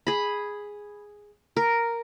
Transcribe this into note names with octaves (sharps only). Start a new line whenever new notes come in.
G#4 B5
A#4